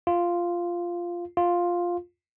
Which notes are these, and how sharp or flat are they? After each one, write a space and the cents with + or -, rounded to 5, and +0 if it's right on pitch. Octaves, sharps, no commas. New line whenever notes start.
F4 -5
F4 +5